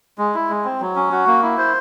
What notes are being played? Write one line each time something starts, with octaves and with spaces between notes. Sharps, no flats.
G#3
E4
G#3
C4
F#3
C#4
F#4
A#3
E4
C5